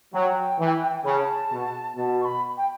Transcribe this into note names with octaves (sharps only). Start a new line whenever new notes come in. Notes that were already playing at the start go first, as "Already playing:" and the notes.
F#3 G5
E3
C#3 A5 B5
B2
B2 A5
C#6
B5
G5